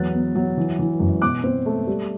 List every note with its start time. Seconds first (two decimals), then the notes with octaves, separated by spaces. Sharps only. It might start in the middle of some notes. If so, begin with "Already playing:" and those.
Already playing: E2 F#3 F#6 A6
0.13 B3
0.35 F#3
0.58 E3
0.79 E3
1.00 F#2
1.22 B2 D6 F#6
1.44 C4
1.66 A3
1.87 G3